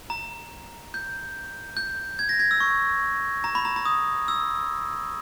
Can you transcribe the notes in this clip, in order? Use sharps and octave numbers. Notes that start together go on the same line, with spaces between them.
A#5
G6
G6
G#6
A#6
G#6
E6
C#6
A#5
B5
A#5
A#5
D#6
E6